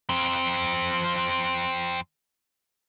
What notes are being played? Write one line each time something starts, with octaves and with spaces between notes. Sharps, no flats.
F2 C4